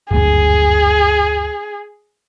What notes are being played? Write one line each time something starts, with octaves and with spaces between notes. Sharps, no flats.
F#1 D2 G2 G#4